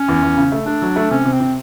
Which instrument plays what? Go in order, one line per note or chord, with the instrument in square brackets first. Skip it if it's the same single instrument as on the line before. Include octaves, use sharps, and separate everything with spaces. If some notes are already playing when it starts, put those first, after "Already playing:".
Already playing: [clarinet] C#4
[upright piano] E2
E2
C#3
A3
[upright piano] A3 [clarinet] D4
[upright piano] F#3
A3
[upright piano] C3 [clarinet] C#4
[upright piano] C3
[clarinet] C4
[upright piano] C3